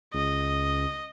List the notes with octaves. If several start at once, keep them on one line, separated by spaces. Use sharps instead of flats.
C#2 D#5